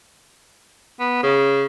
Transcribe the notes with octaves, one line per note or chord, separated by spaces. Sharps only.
B3
C#3